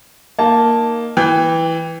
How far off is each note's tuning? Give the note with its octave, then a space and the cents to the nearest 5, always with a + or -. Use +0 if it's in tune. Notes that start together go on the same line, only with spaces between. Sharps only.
A#3 +0 D#4 +0 A5 +0
E3 +0 G5 +25